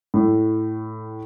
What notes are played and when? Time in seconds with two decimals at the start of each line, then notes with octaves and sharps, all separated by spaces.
0.14 A2